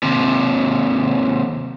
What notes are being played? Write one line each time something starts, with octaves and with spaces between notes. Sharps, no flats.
D#2 C3